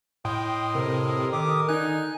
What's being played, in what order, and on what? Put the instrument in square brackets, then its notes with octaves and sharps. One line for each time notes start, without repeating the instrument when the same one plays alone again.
[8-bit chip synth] A2 [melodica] D#5 C6 D#6 [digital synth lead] G5
[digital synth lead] C3 [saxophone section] A4 A#4
[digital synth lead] D#3 [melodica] G4 D6 D#6
[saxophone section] D3 D#4 [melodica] G#5 [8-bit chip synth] F#6